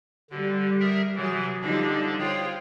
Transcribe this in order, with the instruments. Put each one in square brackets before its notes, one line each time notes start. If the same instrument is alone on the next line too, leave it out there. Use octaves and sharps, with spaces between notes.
[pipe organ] D3 [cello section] G3
[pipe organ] G#4 A#4 E5
[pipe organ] C3 E3 [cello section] F#3 G#4
[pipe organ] D3 D4 [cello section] F3 G3 D#4
[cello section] F4 C5 [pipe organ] G#4 C#5 G5